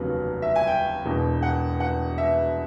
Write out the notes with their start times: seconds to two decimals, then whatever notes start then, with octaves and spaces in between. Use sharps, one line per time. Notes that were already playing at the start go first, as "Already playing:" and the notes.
Already playing: F1 D#2 C#3 F#3 B3
0.42 E5
0.56 G#5
0.67 G5
1.05 E1 E2 B2
1.43 F#5
1.80 F#5
2.18 E5